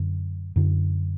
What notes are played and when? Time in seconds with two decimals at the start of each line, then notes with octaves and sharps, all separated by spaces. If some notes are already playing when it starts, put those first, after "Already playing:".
Already playing: F#2 D3
0.56 F#2 D3